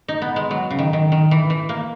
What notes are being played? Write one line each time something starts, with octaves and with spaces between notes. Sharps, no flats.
D#4
B3
G#3
F#3
C#3
D#3
D#3
D#3
E3
E3
A#3